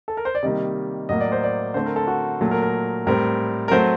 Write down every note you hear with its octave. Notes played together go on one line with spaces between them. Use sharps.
A4
A#4
C5
D5
C3 D#3 G3 A#3 D#5
A2 F#3 A#3 D#5
D5
C5
D5
D3 A3 C4 C5
A#4
A4
F#4
A#2 F#3 A3
A#4
A#4
A2 G3 C4 A#4
A#4
F#3 A3 C4 C5